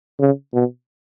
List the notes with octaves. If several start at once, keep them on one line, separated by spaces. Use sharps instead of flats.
C#3
B2